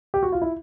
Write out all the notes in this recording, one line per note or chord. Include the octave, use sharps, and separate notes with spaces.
G4
F#4
F4
E4